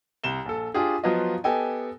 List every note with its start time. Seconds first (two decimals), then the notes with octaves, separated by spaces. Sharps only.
0.24 C2 E7 G7
0.46 A#1 A4
0.74 D4 F4 G4 G#4
1.04 F3 F#3 B3 F4 D#5
1.44 B3 G4 A4 D#5 G5 G#5